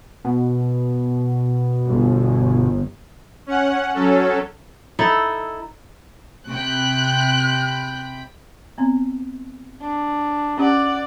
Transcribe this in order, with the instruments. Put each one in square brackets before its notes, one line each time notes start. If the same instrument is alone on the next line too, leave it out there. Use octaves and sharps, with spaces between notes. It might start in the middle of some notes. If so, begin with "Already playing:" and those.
[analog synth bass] B2
[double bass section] G1
[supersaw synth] C#4 F#5
F#3 C#4 A4
[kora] D#4 E4 A4
[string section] C3 G5 B5 [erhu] F#6
[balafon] B3 C4
[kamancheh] D4
[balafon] C#4 G4 [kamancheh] D5 F#5